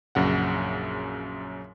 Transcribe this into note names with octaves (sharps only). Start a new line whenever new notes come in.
A#1 F#2 C#3 F#5